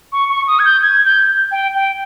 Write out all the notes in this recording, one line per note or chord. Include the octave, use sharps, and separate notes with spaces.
C#6
C#6
D#6
G#6
G6
G#6
G6
G5
G5